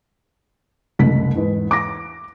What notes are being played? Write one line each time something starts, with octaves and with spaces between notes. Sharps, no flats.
F#1 C2 A3 B6
E2 G#2
D6 A#6